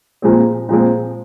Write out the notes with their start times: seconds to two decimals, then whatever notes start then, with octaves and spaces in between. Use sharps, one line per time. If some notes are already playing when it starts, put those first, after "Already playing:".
0.22 A#2 F3 G#3 C4
0.69 A#2 F3 G#3 C4